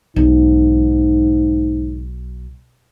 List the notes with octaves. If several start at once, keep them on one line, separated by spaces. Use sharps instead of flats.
B1 G#2